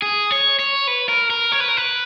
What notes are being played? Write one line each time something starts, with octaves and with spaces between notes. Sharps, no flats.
G#4
C#5
C#5
B4
A#4
A#4
C#5
B4
A#4
B4